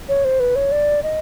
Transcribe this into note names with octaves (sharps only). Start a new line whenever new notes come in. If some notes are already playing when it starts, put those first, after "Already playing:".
C#5
C5
B4
C#5
D5
D#5